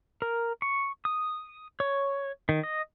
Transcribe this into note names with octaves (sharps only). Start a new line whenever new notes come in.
A#4
C#6
D#6
C#5
D#3
D#5